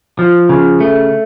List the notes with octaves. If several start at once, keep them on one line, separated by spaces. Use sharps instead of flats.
F3
C#3
A3